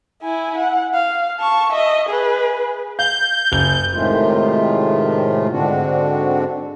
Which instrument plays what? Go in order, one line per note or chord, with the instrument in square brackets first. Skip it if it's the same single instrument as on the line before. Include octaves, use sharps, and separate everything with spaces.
[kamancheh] E4 G#5
F#5
F5
A5 C#6
D#5 E5
G#4 B4
[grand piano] F5 [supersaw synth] G6
[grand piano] F#1 G7
[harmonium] A2 C3 D#3 G#3 A3 F4
G#2 D3 C4 D4 F#4